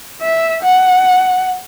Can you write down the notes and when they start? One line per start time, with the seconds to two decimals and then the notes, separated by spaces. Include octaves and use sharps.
0.22 E5
0.63 F#5